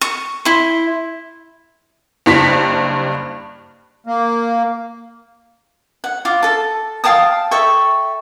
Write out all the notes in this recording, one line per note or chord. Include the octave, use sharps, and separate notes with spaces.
C#6
E4 C6
F#1 G2 B6
A#3
F#5
F4 D6
A4 A5
F5 G5 A5 D#6
A4 E5 G5 C#6